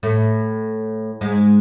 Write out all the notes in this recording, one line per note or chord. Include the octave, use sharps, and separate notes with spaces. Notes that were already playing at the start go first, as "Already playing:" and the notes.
A2 A3
G#2 G#3